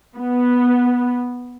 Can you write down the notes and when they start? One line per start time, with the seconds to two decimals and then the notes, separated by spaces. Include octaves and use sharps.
0.17 B3